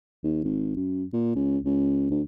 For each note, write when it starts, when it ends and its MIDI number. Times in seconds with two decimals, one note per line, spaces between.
0.23 0.42 39
0.44 0.73 32
0.76 1.04 42
1.13 1.35 46
1.35 1.58 37
1.65 2.10 37
2.11 2.22 38